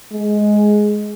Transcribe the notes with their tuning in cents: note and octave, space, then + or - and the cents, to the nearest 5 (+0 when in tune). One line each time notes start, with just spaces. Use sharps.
G#3 +10